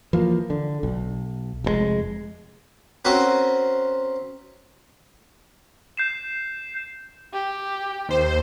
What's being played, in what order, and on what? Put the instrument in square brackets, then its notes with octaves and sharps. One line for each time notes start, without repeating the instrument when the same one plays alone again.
[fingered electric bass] E3 F3 A#3
D3
B1
F1 C3 G#3
[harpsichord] C4 C#4 F#4 A#4 B4
[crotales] G6 C7 E7
[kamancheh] G4
[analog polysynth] D#2 C5